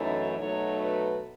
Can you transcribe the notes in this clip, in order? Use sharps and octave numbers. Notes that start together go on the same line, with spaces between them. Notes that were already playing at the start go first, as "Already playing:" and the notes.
Already playing: F#2 E3 A3 D#4 C#5
B2 F#3 A3 D#4 C#5
B4